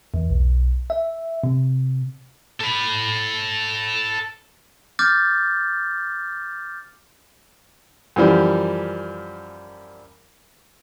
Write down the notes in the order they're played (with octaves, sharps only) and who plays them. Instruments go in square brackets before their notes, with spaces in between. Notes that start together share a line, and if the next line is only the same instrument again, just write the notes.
[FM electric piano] E2
B1
E5
C3
[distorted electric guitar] A4 B5
[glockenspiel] D6 F6 G6 A6
[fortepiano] F#2 E3 F3 G3